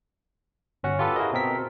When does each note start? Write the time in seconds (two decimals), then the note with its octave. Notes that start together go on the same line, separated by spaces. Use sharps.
0.83 G1 C#4 F#4 F#5
0.99 F4 G4 A4 B4
1.16 E4 F#4 G#4 A#4 D#5
1.33 B2 C4 A#4 B6